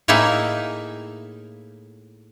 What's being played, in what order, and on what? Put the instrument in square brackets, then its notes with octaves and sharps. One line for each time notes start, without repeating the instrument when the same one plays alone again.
[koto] A2 A#3 D#4 E4 G#4 E5